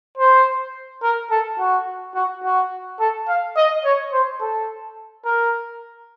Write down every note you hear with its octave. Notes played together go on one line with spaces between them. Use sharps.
C5
A#4
A4
F#4
F#4
F#4
A4
F5
D#5
C#5
C5
A4
A#4